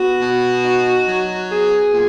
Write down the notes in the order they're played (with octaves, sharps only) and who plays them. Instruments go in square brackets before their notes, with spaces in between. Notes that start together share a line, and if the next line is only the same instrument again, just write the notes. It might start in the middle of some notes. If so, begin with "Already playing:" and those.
Already playing: [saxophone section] B3 F#4
B2
D#4
F#3
B3 G#4
A#2